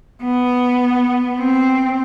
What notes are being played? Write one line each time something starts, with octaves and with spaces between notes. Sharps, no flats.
B3
C4